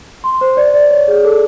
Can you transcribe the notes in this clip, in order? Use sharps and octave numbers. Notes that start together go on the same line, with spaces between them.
C6
C5
D5
D5
C#5
G#4
A4